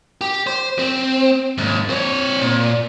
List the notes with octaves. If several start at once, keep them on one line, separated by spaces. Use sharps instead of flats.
G4
C5
C4
D#2 G#2
C4 C#5
A#2